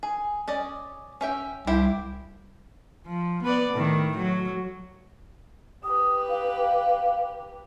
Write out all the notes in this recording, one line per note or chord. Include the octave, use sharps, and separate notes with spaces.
G#4
C#4 D5 D#5
C#4 E5 G5
C2 E4 G4 C5
F3
B3 B4 D5
A2 D#3
F#3
G4 B4 D#6
F5